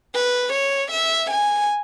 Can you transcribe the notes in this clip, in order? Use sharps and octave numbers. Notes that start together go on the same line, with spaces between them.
B4
C#5
E5
G#5